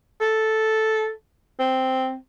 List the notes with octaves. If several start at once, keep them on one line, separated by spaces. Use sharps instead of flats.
A4
C4